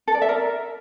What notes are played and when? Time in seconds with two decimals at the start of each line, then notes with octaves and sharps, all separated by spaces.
0.08 A4
0.15 D5
0.22 E5
0.29 A#4